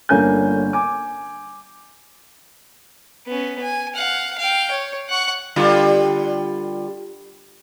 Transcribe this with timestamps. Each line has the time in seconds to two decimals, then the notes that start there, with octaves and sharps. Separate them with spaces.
0.09 G1 D3 A#3 C#4 G#5 G6
0.73 G#5 D6
3.27 B3 C#4
3.61 G#5
3.95 F5 F#5
4.38 F5 G5
4.71 C#5
5.09 F#5 C#6
5.56 D3 G3 F4